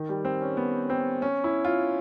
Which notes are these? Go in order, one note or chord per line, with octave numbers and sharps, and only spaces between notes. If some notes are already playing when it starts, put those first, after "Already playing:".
Already playing: D#3
G3
C4
C#4
B3
C4
C#4
E4
F4